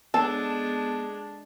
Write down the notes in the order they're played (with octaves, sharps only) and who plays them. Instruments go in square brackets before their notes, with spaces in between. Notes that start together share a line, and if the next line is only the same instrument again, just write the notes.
[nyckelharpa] G#3 D4 [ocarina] B3 [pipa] A4 [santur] A5